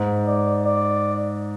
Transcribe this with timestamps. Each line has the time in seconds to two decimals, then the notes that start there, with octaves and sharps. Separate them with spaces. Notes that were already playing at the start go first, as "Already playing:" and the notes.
Already playing: G#2
0.27 D5
0.66 D5